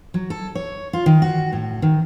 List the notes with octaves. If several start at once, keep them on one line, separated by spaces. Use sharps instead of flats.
F#3
A4
C#5
F4
D#3
F#4
A2
D#3